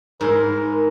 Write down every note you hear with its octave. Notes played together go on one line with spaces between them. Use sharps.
G#2 E4 A#4 C6